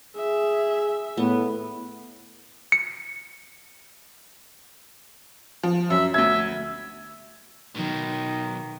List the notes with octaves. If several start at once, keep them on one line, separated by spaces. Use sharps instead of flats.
G#4 E5
A2 B3
C#7
F3
F#2 E5
D2 E5 G#6
B2 D#3 F#3